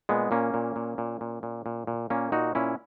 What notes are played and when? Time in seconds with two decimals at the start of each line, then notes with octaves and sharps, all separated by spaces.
0.09 A#2 G#3 B3
0.31 A#2 A#3 C#4
0.54 A#2
0.76 A#2
0.98 A#2
1.21 A#2
1.43 A#2
1.66 A#2
1.87 A#2
2.10 A#2 A#3 C#4
2.32 A#2 D#4 F#4
2.55 A#2 C#4 E4